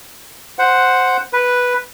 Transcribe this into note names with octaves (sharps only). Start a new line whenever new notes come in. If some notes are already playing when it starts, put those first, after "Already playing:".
C5 F#5
B4